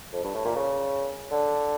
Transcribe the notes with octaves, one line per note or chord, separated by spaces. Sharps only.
F2
G2
A2
A#2
C#3
D3